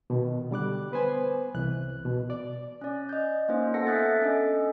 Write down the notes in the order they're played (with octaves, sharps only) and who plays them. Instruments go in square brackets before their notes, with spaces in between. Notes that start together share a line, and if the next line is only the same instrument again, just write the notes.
[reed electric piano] B2 D#3
D3 G3 D6 F#6
B3 B4 C5 G#5
C2 E3 F#6
B2
D5
[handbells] C#4 D5
D#5 G6
A#3 C#4 D#4 F4 C5
B3 A4 F#5 A5 A#6 C#7
A4 E5 D#6 F#6 G6 A6
C#4 D4 A4 D#5